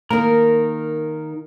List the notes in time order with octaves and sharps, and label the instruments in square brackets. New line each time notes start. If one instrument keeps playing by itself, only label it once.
[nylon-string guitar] D#3 A#3 [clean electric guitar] A#4